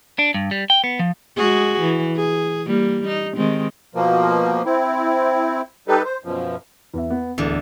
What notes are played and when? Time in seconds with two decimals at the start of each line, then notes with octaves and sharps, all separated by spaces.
0.19 D4
0.34 G2
0.51 G3
0.70 G5
0.84 B3
0.99 F3
1.36 G#3 F#4 G#4
1.80 E3
2.16 G#4
2.66 G3 A#3
3.07 D#4
3.37 D#3 G#3 C4
3.95 B2 F3 A#3
4.65 C4 E4
5.88 G3 D#4 G4 A4 B4
6.04 C5
6.24 F#2 B2 F3
6.94 E2 E5
7.10 B3
7.38 D1 E2 D3